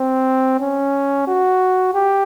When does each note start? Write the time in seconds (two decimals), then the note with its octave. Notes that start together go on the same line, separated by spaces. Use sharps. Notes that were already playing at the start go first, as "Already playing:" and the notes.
Already playing: C4
0.60 C#4
1.27 F#4
1.94 G4